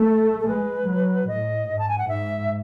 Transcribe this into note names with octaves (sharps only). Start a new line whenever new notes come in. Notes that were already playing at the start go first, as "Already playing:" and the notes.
Already playing: A3 A4
A4
G#3 B4
F#3
A2 D#5
G#2
A5
G#5
F#5
G#2 E5